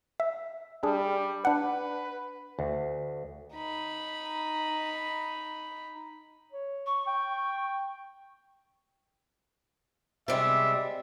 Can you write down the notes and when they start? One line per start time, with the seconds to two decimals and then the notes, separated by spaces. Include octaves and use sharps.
0.20 E5
0.83 G3 D4 G#4
1.45 D4 B4 F#5
2.59 D2
3.54 D#4 B5
6.52 C#5
6.86 C#6
7.07 G5
10.28 C3 G3 G#3 E5